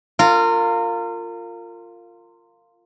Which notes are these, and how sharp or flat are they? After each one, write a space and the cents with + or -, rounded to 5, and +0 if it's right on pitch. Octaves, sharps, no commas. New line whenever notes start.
F4 +0 A#4 -30